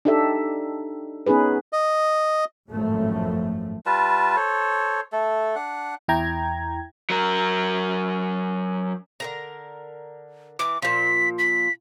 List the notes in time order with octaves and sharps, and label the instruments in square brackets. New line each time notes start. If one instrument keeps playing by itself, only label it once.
[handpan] D4 D#4 G4 A4 E5
B3 C#4 D#4 G#4 B4
[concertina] D#5
[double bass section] G#1 F#2 A2 F3 A3
[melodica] G3 F4 B4 A5
A4 C5 C#5
A3 A4
D4 F#5
[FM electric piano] E2 E4 G5 A#5 G#6
[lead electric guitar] F#3 A#4
[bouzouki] D3 A#4 A#5
[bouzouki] E3 [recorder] D6
[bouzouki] A#2 F3 [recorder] B6
[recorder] B6